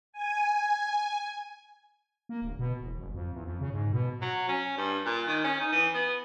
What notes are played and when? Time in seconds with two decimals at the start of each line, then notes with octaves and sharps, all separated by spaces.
0.13 G#5
2.29 A#3
2.42 D1
2.59 B2
2.81 E1
2.97 F#1
3.14 F2
3.33 E2
3.44 F2
3.61 C#3
3.72 G#2
3.92 B2
4.22 F#3
4.49 C#4
4.77 G2
5.06 A#2
5.28 D#3
5.44 C#4
5.60 D#4
5.72 E3
5.94 B3